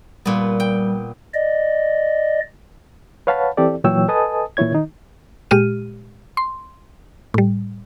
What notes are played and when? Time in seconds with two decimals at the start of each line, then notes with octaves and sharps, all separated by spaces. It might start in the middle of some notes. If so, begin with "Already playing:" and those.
0.25 A#2 G3 B3
0.60 G5
1.34 D5 D#5
3.27 B4 C#5 F5 F#5 A5 B5
3.57 E3 C4 E4 G4 A4 D5
3.84 A#2 E3 F#3 C#5 G5 E6
4.09 A4 B4 D#5 G#5 A5 D#6
4.57 A#2 E3 E4 C#5 G#6
4.72 D#3 D#4
5.51 A#2 G#3 G4 F6 D#7
6.37 C6
7.34 A2 G3